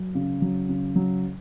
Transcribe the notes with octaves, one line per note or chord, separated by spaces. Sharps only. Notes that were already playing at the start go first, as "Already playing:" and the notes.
Already playing: F#3
C#3
F#3
C#3
F#3